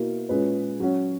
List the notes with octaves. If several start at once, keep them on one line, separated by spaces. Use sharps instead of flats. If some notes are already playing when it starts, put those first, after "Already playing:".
Already playing: B2 A#3 E4 A#4
A#2 G#3 C#4 G#4 B4
F#3 C#4 F#4